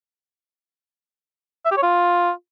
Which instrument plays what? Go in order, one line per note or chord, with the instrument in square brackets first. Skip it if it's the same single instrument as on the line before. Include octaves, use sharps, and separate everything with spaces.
[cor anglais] E5
G4
C#5
F4